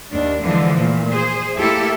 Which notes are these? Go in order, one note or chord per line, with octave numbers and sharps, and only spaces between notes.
D#2 D4
D3 E3 F3 G#3
A#2 A3
G#4 C5
A3 A#3 E4 G4 A4 E5